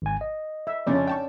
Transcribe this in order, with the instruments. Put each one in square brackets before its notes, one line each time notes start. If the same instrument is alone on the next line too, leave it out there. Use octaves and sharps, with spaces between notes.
[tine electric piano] G#1 G#5
D#5
[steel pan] E5
[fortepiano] F2 C#3 [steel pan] C#4 D4 D5
[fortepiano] G5 A5 C#6